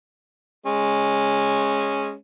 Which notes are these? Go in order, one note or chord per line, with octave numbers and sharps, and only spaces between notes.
G#3 C#4